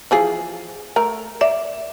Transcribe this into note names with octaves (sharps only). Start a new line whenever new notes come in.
E3 F3 G#4
A3 A#4
D5 E5